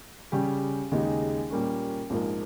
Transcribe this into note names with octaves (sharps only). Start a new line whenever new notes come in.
C#3 G3 C#4 G4
D#2 C#3 G#3 D#4 G4
A#2 G3 A#3 C#4
A#1 G#2 F3 A#3